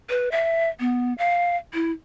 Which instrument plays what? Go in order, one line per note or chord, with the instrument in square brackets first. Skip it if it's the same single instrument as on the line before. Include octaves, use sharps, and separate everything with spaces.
[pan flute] B4
E5
B3
F5
E4